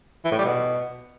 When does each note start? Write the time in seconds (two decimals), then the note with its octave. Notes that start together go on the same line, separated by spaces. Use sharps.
0.25 E3
0.32 A2
0.39 G3
0.45 B2